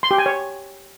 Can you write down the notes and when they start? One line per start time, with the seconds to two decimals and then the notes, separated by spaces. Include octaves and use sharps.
0.03 C6
0.11 G4
0.18 G#5
0.26 C#5